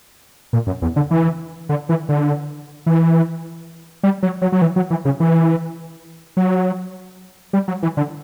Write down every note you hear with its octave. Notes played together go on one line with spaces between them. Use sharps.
A#2
F#2
E2
D3
E3
D3
E3
D3
E3
G3
F#3
F#3
F#3
E3
F#3
E3
C#3
E3
F#3
G3
F#3
E3
D3